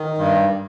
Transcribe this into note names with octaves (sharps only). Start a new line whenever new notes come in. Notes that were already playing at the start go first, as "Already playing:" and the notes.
Already playing: D#3
G2